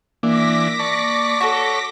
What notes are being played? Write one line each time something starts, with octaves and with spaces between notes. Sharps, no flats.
E3 A#3 D4 D6 A#6 B6
D5 A5 C#6
F#4 A4 C#5